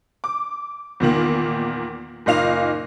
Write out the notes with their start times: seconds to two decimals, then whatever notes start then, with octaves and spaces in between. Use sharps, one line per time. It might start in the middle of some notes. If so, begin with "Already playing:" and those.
0.24 D6
1.00 E2 A#2 D#3 A#3
2.26 F#1 A#2 D#4 F5 F7